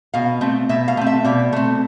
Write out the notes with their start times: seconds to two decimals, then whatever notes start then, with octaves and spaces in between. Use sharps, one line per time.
0.14 B2 F5
0.41 A3 C4
0.69 B2 E5
0.88 F5
0.97 A3 C4
1.07 E5
1.24 B2 D5
1.53 A3 C4